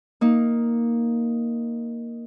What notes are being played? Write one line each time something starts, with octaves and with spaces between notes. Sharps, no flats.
A#3 D#4